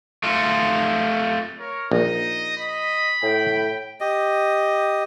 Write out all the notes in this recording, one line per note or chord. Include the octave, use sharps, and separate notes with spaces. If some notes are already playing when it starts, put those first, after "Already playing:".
A3 F4
A#4 C#5
A#1 D#4 D#5
D#5 B5
A2 G5
G4 D#5